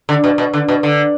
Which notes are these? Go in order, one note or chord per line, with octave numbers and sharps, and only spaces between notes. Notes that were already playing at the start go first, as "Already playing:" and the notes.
D3
B2
B2
D3
B2
D3